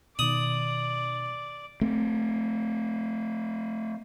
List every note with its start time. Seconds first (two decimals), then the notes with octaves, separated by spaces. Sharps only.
0.19 B2 D#3 D5 D#6 F#7
1.81 A3 C4